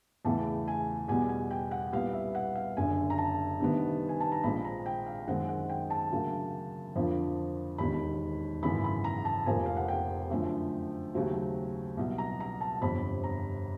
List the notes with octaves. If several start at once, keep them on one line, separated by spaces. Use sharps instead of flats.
E2 C#3 E3 A3 A5
G#5
E2 B2 G3 G#5
G#5
G5
F#5
C2 A#2 G3 B3 F5
E5
F#5
F5
F#1 F#2 D3 G#5
A#5
A5
D2 C3 D#3 G3 B3
G#5
A5
A#5
A#1 A#2 F3 G#3 C4 B5
A#5
G5
F5
F#2 D#3 G#3 C4 F#5
F#5
G5
A5
D2 C#3 F#3 A#3
F2 D3 F3 A#3
E1 D#2 D#3 B5
G#1 F#2 C#3 E3 B5
B5
A#5
A5
F1 F2 C3 F3 A#3 G#5
F5
F#5
G5
F#2 D3 F3 A3
D#2 C#3 F#3 A3 C4
C2 B2 F#3
A#5
A#5
A5
G1 F2 C3 B5
A#5